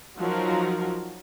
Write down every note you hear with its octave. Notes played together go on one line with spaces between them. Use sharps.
F3 F#3 D#4 F4 F#4 A#4